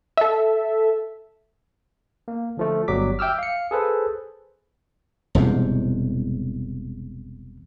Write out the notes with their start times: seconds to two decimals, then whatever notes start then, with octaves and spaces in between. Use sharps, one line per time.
0.17 A4 E5
2.28 A#3
2.57 D3 F3 A3
2.88 G1 F#3 G3 D6 B6
3.19 E5 G5 D6 E6 F6
3.39 F5 C#7
3.71 G#4 A4 B4 C5
5.35 E1 C2 G#2 C3